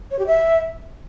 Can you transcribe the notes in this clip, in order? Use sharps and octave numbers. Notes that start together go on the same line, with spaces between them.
C#5
G4
E5